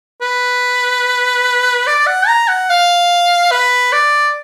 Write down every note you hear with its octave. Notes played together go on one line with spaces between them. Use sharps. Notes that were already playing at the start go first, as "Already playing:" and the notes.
B4
D5
F#5
A#5
F#5
F5
B4
D5